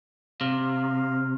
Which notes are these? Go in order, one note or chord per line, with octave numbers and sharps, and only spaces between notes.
C3 F5